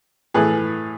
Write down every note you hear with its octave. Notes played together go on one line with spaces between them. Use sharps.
A2 E3 A3 G#4 B4